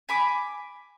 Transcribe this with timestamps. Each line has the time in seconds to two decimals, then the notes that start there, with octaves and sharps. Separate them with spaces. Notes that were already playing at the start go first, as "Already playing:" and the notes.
0.09 G#5 B5 D6